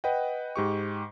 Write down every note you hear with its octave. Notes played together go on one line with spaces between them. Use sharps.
B4 D#5 F#5 G5
G#2 G4 C#6